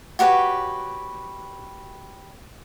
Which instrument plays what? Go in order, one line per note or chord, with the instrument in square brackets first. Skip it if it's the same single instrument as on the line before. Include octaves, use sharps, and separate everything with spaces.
[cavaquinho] F#4 G4 B4 C#5